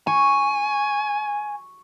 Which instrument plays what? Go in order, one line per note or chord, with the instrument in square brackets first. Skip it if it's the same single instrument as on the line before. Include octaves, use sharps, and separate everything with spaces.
[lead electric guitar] G#5 [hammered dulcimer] C#6